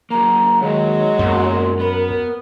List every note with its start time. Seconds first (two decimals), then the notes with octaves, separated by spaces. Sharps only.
0.10 F#3 A#3 A#5
0.62 D#2 F#3 G#3 C#5
1.19 F#2 B2 A#3 C6
1.80 B3 A#4 B5